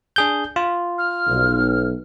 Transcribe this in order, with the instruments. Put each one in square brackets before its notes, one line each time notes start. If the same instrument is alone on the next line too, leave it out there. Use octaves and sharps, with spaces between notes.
[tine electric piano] D4 G#4 G6
F4
[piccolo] F6
[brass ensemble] B1